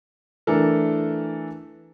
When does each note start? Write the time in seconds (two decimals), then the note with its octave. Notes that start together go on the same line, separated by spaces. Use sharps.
0.47 E3 A3 D4 A4 A#4